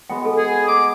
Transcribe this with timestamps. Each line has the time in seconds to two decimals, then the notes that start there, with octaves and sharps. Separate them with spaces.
0.10 G#3 B3 F#4 G5
0.25 A4
0.38 G#4
0.68 D#5 D6